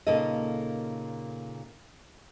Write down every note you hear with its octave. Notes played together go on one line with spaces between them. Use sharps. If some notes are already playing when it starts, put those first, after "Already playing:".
A#2 C#3 A#3 D#4 A4 D#5